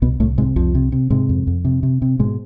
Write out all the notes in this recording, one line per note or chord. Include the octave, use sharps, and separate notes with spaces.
C2 B2 B3
C2 A2 A3
G#2 C3 G#3
C2 F2 F3
C3
C3
G#2 C3 G#3
F2
F2
C3
C3
C3
G#2 B2 G#3